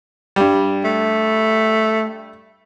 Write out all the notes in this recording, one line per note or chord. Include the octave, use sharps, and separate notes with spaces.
G2 G3
A3